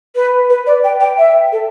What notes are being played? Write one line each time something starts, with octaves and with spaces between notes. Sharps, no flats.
B4
B4
D5
G5
G5
E5
A4